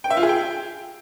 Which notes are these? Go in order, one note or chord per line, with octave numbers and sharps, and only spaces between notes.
G5
E5
F4
G#4
G5